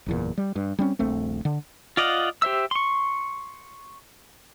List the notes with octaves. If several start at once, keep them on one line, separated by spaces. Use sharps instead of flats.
F#1 E2 A#2
G3
G2
G3 C4 C#4
D#1 A#1 A3 C4
D3
F4 D5 D#5 F5 F#5
G4 C5 E5 E6
C6 C#6